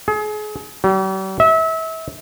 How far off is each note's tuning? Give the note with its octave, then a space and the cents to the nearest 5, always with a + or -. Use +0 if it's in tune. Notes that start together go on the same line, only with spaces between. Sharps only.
G#4 +35
G3 -45
E5 -30